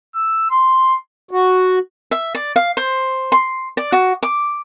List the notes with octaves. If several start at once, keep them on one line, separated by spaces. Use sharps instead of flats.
E6
C6
F#4
E5
D5
F5
C5
C6
D5
F#4
D6